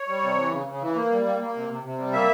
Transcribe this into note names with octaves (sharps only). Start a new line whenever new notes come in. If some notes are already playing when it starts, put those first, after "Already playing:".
Already playing: C#5
G3
C3
E3
C#3
C#3
E3
A#3
G3
A#3
A#3
C3
C3
C3
G3
A#3 E5